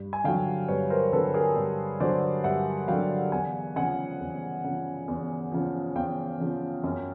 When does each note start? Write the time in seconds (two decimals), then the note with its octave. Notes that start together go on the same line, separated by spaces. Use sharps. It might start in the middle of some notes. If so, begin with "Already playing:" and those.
Already playing: G2
0.13 G#5
0.24 D3 F#3 F5 G5
0.68 G2 B4 C#5
0.90 A#4 C5
1.13 D3 F#3 A4 B4
1.34 G#4 A#4
1.57 G2
2.00 D3 F#3 C5 D5
2.44 G2 E5 F#5
2.88 D3 F#3 F5 G5
3.32 E2 F#5 G#5
3.76 C#3 F3 F#5 G#5
4.20 E2
4.64 C#3 F3
5.08 E2
5.52 C#3 F3
5.95 E2 F5 G5
6.40 C#3 F3
6.84 F#2